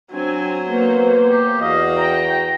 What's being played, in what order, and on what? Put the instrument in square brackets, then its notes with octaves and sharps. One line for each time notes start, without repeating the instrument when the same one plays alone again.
[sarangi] F#3 [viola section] C4 G#5 [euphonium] D4
[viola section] A#3 C5 C#5 [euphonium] B3
[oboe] G4
[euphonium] E2 [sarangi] F#4 [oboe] D#5 [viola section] F5
[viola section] G5 [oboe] A#5